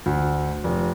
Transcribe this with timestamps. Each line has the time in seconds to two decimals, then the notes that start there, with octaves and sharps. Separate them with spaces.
0.06 D2
0.64 F1